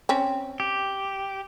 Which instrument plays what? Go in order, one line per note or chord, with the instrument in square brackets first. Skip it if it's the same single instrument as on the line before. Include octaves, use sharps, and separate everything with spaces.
[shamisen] C4 C#4
[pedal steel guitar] G4